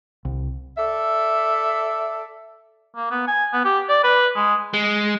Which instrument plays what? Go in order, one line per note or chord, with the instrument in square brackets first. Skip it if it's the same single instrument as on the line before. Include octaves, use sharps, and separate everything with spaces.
[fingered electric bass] C2
[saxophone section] A4 D5 E5
[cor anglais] A#3
B3
G#5
B3
G4
D5
B4
G#3
[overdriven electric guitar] G#3